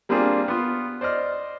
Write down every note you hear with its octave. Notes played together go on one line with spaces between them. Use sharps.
G3 A#3 C4 D4 F4 G#4
B3 F4
C5 D5 D#5 F6